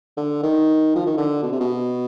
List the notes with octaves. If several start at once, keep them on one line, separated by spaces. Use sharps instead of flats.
D3
D#3
F3
D#3
D3
B2
C3
B2